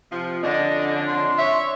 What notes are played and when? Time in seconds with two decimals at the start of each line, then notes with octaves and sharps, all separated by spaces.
0.10 C3 F3
0.43 F2 D3 C#4 D4 D#5
1.07 C6
1.38 C#5 E5